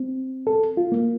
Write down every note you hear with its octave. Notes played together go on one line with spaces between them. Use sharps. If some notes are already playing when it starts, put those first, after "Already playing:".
Already playing: C4
A4
F4
A#3